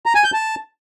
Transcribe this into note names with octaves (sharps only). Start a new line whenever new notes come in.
A#5
G#5
G6
A5